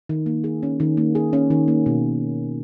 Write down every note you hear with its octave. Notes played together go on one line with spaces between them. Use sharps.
D#3
A#3
G#4
C#4
D#3
A#3
G#4
C#4
D#3
A#3
B2